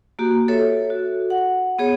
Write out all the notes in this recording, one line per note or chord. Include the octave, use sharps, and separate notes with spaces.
A#3 F#4 G4
A4 C#5 E5
F#4
F#5
B3 G#4 C#5